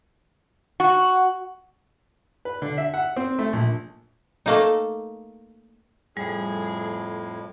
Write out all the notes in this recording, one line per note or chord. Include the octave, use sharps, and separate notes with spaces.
F#4
B4
D3
E5
F#5
C4
A3
A#1
A3 A#3 D#4
F2 A2 G3 G#4